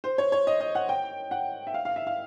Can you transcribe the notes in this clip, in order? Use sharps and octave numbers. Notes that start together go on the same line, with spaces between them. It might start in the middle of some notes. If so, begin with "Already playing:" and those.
C5
C#5
C#5
D#5
D#5
F#5
G5
F#5
E5
F5
F5
E5
F5